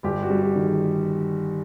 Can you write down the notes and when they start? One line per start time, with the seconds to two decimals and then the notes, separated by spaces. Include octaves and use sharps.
0.03 G1 G4
0.23 F#4
0.30 G3
0.42 G4
0.55 D#3
0.62 G#4